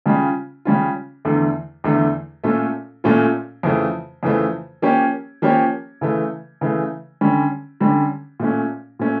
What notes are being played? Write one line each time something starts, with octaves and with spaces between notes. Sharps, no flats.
C#3 G3 C#4 F4
C#3 G3 C#4 F4
E2 D3 A3
E2 D3 A3
A#2 A3 C#4 F4 A4
A#2 A3 C#4 F4 A4
F2 C#3 E3 A3
F2 C#3 E3 A3
F3 A#3 C#4 G4 C#5
F3 A#3 C#4 G4 C#5
C#3 E3 A3
C#3 E3 A3
D3 G3 C#4
D3 G3 C#4
A#2 A3 C#4
A#2 A3 C#4